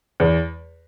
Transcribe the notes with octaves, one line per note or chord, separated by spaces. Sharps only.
E2